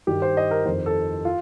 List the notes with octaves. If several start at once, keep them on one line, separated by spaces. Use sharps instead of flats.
G2 D#3 G4
C5
D#5
A#4
F2 D#3 C5
A4
F4